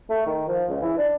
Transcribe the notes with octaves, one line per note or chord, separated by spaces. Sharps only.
A3
D#3
F3
C#2
E3
D4